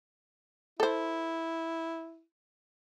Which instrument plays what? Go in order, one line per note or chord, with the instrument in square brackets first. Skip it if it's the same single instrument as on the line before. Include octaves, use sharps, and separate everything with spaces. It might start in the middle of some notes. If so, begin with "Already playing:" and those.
[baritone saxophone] E4 [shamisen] A4 C5